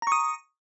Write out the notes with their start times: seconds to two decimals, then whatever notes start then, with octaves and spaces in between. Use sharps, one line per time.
0.02 A#5
0.07 C#6
0.12 D#6